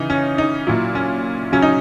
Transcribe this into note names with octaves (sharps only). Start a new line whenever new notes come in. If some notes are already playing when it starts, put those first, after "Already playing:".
Already playing: C#3 E3 D#4
C#4
D#4
A#2 F#3 E4
C#4
C#3 F#3 C#4
D#4